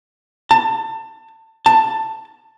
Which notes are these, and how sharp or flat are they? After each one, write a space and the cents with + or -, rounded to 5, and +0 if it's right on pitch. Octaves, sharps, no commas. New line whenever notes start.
A5 +25
A5 +10